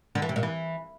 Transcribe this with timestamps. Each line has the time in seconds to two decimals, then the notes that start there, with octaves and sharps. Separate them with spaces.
0.15 D3
0.22 E3
0.29 C3
0.36 A#2
0.43 E3